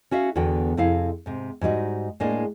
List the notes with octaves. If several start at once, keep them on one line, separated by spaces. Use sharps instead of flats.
C#4 F#4 E5 F5
E2 D3 B3 F#4 B4 G5
F2 C3 E4 G#4 F5
G#2 C3
G#2 G3 D#4 F#4
A2 G#3 A#3 D4